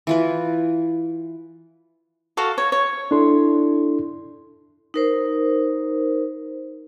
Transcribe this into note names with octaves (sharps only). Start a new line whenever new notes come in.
E3 F4 B4
F#4 A4 F5
C#5
C#5
D4 E4 A4 C6
D#4 A#4 C5